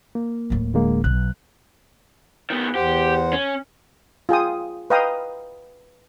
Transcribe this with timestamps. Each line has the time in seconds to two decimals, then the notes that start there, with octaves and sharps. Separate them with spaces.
0.15 A#3
0.50 D1 A2
0.74 D3 G#3 A#3
1.04 B1 F#6
2.50 D#3 B3
2.75 E2 G4 C5 F#5
3.33 C#4
4.29 F4 G#4 G5 D#6
4.90 B4 D#5 F5 G5 A#5 D#6